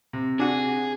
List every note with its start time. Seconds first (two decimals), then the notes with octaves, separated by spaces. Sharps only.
0.13 C3
0.39 D4 F#4 G#4